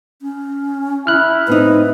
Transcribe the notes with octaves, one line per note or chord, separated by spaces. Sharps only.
C#4
E4 F6 F#6
A2 C4 D#4 B4